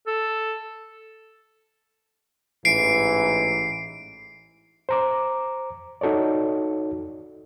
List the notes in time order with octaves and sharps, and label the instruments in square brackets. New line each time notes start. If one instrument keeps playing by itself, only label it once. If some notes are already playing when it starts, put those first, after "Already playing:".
[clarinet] A4
[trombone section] A1 G#2 E3 [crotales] C7 D7
[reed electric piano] C5 A#5 D6
D#4 F#4 A4 C#5 D5